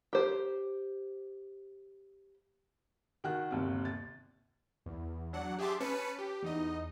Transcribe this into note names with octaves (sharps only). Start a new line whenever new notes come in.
G4 C5
D#3 F#4 F#6
G1 D#2 C3
A6
E2
F#3 D4 F#5
G4 G#4 E5 A5 C6 D6
C#4 B4 A5 B6 C#7 D#7
G4
E2 D#4 D#5